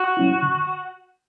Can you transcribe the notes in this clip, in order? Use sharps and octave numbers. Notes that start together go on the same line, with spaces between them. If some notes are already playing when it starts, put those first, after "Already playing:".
Already playing: F#4
F#3 C#4 E4
D3